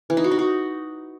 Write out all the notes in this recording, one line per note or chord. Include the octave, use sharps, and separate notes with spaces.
E3
D#4
F#4
D#4
F#4